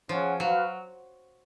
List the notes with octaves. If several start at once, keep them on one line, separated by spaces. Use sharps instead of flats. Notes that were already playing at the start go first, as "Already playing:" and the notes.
F3 C#4 G#4 C#5 F#5
F#3 F#4 B4 F5